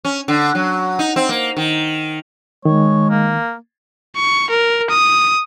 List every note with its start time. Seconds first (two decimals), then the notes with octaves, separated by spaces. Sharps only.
0.05 C#4
0.28 D3
0.55 F#3
0.99 D#4
1.16 C4
1.29 A#3
1.57 D#3
2.65 D#3 G#3 C#5
3.10 A#3
4.16 C#6
4.50 A#4
4.90 D#6